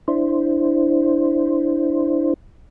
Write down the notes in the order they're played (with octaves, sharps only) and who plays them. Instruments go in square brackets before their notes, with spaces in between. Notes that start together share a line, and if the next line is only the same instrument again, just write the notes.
[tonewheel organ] D4 E4 C5